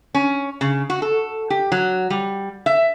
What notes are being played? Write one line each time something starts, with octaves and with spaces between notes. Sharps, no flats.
C#4
C#3
F#4
A4
G4
F#3
G3
E5